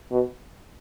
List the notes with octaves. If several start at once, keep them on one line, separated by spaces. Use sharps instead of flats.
B2